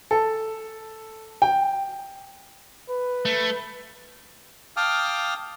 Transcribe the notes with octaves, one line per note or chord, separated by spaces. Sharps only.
A4
G5
B4
A3
F5 G5 A5 D6 D#6 F6